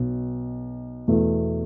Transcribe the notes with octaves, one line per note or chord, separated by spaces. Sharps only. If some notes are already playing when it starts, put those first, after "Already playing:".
Already playing: B1 B2 B3
E2 B2 A3